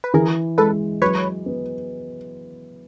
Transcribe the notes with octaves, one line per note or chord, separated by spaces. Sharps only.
B4
E3 G#4 A#4
G#3 A4 B4
F#3 B4 C#5
B3